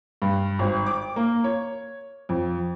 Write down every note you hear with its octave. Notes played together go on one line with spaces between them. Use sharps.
G2
G#1
D6
A#3
C#5
F2